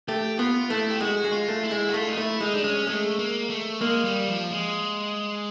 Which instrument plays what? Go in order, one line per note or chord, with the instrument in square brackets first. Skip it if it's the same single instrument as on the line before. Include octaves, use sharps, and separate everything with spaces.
[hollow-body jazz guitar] A3 [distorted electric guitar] G4
[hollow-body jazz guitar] B3 [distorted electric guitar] F4
[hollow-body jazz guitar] A3 [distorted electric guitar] E4
[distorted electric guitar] G4
[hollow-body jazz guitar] G#3 [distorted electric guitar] F#4
[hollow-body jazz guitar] G#3
[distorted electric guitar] F4
[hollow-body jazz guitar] A3
[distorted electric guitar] E4
[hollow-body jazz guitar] G#3
[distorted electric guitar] F#4
[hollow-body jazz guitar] A3 [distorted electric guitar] F4
[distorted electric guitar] D#4
[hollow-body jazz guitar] A3 [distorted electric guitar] E4
[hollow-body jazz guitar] G#3 [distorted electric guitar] D#4
[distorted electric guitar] D4
[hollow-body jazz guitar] G#3 [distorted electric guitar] C#4
[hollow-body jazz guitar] G#3 [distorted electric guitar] A3
[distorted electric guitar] A#3
A3
[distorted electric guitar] G#3 [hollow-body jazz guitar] A#3
[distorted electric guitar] G3
F3
G#3